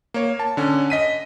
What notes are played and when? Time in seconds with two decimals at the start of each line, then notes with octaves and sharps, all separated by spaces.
0.14 A#3 C#5
0.39 A5
0.57 D3 C#4
0.90 D#5 B6 D#7